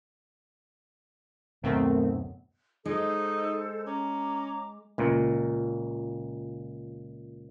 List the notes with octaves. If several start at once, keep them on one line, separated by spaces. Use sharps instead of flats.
D1 F#2 B2 D#3 A3 C4
G#3 D#4 A4 C5
C#4 A#5 D6
C#2 A#2